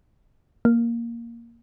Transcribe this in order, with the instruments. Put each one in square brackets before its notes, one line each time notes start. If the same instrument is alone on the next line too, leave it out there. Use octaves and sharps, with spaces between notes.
[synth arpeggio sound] A#3